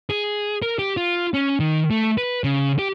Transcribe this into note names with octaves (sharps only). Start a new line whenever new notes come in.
G#4
A#4
G4
F4
C#4
D#3
A3
B4
C#3
G4